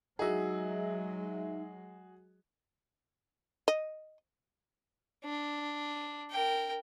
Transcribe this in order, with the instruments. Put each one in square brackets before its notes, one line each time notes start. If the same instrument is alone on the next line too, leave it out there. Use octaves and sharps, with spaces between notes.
[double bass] F#3 G#3 [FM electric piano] D#4 E5 [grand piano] F#4 G#4
[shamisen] D#5
[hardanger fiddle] D4
A#4 G5